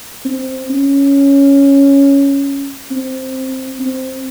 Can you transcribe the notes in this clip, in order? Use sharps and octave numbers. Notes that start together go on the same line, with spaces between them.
C4
C#4
C4
C4